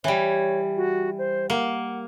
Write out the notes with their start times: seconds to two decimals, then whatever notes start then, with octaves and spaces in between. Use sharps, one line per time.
0.04 E3 G3 C#5
0.77 F#4
1.18 C5
1.50 A#3 F#5